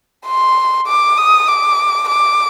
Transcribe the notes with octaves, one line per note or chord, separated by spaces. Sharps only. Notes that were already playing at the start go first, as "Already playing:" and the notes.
C6
D6
D#6
D6
D6